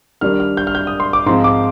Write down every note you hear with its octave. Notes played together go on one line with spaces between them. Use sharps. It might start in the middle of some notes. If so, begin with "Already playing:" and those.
D#3 G3 D4 F6
F6
G6
F6
G6
D#6
C6
D6
G#2 F3 C4 D#4 C6
D6